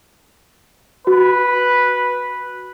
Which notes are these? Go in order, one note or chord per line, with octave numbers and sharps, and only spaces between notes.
F#4 B4